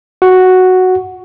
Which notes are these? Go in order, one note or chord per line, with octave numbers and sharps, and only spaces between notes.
F#4